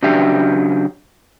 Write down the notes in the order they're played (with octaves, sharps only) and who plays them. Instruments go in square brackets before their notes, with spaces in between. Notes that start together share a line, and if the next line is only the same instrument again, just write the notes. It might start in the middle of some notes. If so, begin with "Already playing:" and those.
[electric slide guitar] C#3 F#3 D4 G4 E5